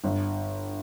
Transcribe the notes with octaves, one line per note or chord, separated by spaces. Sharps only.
G1